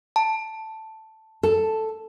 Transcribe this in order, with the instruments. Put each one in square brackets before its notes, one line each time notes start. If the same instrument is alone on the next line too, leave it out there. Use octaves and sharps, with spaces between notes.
[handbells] A5
[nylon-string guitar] A4